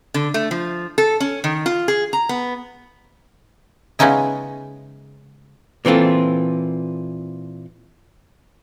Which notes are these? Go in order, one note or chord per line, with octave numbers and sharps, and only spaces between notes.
D3
A3
F3
A4
C#4
D#3
F4
G#4
A#5
B3
C#3 G#3 B3 C#4 D#4 E4
A#2 E3 C4 F4 A4